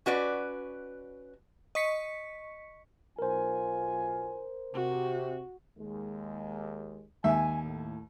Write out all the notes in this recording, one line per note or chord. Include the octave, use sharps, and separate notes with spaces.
C#4 F#4 B4 D5
D#5 C#6 B6 C#7
B1 F4 A#4 C5 G#5
C3 F#4
D#2 G#3
D#2 E5 G#5
A2